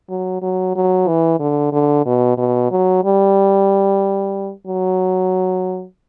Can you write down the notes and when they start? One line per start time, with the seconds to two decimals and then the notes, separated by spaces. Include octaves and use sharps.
0.10 F#3
0.42 F#3
0.76 F#3
1.08 E3
1.40 D3
1.72 D3
2.06 B2
2.38 B2
2.71 F#3
3.04 G3
4.67 F#3